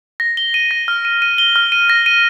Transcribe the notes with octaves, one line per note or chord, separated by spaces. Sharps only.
A#6
G7
D#7
A#6
F6
D#7
D#7
G7
F6
D#7
A#6
D#7